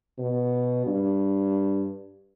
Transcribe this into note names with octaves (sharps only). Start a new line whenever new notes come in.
B2
G2